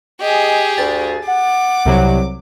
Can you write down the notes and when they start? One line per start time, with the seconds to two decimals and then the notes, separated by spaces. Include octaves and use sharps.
0.21 G4 G#4 D#5 G#5
0.78 D2 G2 A6
1.28 F#5 D6
1.86 C2 C3 F#3